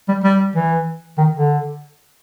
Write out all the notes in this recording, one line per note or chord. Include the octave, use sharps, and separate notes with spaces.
G3
G3
E3
D#3
D3